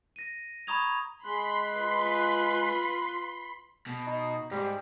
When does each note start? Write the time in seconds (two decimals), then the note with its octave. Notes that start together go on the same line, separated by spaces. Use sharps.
0.16 A#6 D#7
0.67 A#5 B5 C#6 D#6 G#6 F7
1.24 G#3 B5 C6 F#6
1.76 F4 B4
3.86 B2
4.07 D#4
4.51 G#2 G3